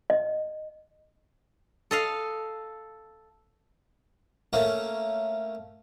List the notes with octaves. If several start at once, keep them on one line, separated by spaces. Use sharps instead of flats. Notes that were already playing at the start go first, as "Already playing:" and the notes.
D#5
A4 D#5 F5
A3 A#3 C#4